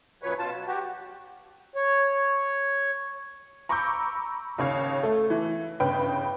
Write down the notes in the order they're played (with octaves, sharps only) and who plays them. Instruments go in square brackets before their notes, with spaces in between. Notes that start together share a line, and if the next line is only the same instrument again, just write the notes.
[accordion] F#2 A#2 F3 F#3 B4 C#5
B2 F4 A5
F#3
F#4 G4
[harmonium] C#5
[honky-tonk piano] A#5 B5 C#6 D6 E6 G6
D#2 C#3 C#5 F5
A3
E3
G1 C#3 B4 G5 B5